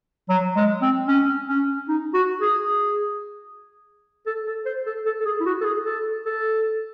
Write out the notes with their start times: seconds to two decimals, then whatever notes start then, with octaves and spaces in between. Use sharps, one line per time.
0.29 F#3
0.56 G#3
0.82 C4
1.08 C#4
1.49 C#4
1.88 D#4
2.14 F#4
2.41 G#4
4.26 A4
4.47 A4
4.66 C5
4.86 A4
5.06 A4
5.20 A4
5.25 G#4
5.40 E4
5.46 F#4
5.61 A4
5.65 G#4
5.85 A4
6.25 A4